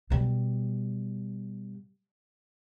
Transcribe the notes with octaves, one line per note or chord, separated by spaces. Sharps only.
B2 G3